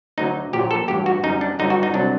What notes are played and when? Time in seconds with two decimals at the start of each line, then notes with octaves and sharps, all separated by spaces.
0.18 D2 D3 F#3 D#4
0.53 A#1 A#2 F#3 G4
0.71 A4
0.88 A1 G2 F#3 G4
1.06 F#4
1.23 F#2 D3 G3 D#4
1.41 D4
1.59 G1 G2 D3 F#3 D#4
1.70 F#4
1.83 D#4
1.94 C2 C3 F#3 D4